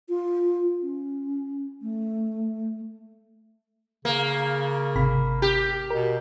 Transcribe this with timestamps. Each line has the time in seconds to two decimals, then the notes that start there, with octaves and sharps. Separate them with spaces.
0.09 F4
0.82 C#4
1.82 A3
4.05 C#3 A#3
4.96 G#1 C3 B5
5.42 G4
5.90 B2 A#4